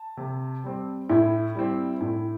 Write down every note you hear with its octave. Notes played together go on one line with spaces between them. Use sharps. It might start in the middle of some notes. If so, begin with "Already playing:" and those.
Already playing: A5
C3
G3 C4
A2 E4 E5
G3 C4
A2